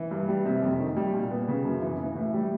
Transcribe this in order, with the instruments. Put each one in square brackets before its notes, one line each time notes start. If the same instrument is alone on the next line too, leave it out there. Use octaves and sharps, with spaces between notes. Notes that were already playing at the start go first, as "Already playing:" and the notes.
Already playing: [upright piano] E3
G2
G3
C3
F2
D#3
G3
A#2
B3
C#3
F#2
E3
E3
A2
G3